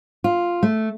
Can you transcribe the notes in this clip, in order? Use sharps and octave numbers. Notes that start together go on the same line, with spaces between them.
F4
A3